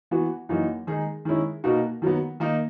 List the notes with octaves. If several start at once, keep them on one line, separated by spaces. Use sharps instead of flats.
E3 B3 F#4
F#2 E3 A#3 D#4 F#4
D#3 G#3 D#4 G#4
D#3 G#3 C#4 E4
B2 A#3 D#4 F#4
D#3 F#3 B3
D#3 A#3 D#4